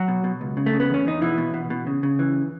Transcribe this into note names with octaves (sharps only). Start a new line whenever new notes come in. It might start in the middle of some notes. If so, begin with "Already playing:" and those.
Already playing: F#3 F#4
B2
B2
C#2
C#3
A3
C#3
B3
E2 C#4
E2 D#4
B2 E3 E4
B2
B2
B2
C#3
C#3
E3